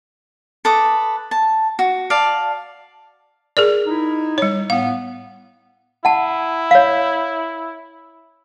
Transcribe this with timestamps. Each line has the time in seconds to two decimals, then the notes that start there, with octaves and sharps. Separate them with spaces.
0.65 A4 B4 D6 D#6
1.31 A5
1.79 F#4
2.10 D5 F5 A5
3.57 G#4 A#4 D5
3.86 D#4 E4
4.38 G3 C#5
4.70 A2 B3 F5
6.05 E4 F#5 A5
6.71 C#5 F5